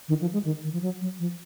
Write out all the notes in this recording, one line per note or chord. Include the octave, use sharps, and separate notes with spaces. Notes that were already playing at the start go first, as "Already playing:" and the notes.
D#3
F3
G#3
D#3
D#3
F3
F#3
F#3
F3